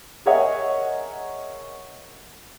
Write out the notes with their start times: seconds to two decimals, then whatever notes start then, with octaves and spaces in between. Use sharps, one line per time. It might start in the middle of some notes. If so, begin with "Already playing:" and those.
0.26 G#4 A#4 C#5 D#5 E5 F#5